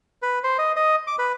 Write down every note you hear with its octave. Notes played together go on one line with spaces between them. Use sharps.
B4
C5
D#5
D#5
D6
B4